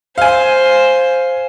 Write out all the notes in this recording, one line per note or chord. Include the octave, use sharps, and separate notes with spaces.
C5 F5 G#5